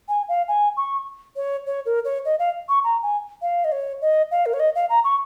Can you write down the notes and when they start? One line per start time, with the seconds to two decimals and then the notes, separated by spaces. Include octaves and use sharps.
0.09 G#5
0.29 F5
0.48 G#5
0.77 C#6
1.36 C#5
1.66 C#5
1.86 A#4
2.05 C#5
2.25 D#5
2.39 F5
2.69 C#6
2.84 A#5
3.03 G#5
3.42 F5
3.64 D#5
3.72 C#5
4.02 D#5
4.31 F5
4.46 A#4
4.53 C#5
4.60 D#5
4.75 F5
4.89 A#5
5.04 C#6